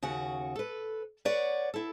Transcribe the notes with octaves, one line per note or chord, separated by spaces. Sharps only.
D#2 C#3 F#4 F#5
A4 B4
B4 C#5 D5 F#5
E4 A4